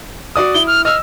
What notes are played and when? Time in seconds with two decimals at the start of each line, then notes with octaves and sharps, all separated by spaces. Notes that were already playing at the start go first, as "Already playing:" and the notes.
0.36 F#4 D5 D#6
0.55 E4 G7
0.67 F6
0.85 D#5 E6 F6